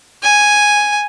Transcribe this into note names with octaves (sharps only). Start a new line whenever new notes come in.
G#5